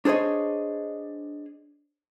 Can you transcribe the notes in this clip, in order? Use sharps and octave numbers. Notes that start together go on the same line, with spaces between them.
D4 G#4 C5 C#5 D#5